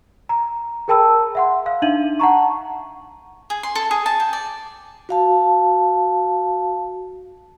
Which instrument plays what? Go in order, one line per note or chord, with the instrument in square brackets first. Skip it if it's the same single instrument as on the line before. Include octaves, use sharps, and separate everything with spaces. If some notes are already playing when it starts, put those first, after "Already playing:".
[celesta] A#5
G#4 A#4 G5 A5 B5 E6
E5 F#5 C6
F5
D4 D#4 E5 D#7 F#7
F#5 A5 A#5 C#6
[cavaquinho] G#4
C6
A4
G#4
A5
G5
D5
[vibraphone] F#4 F5 A5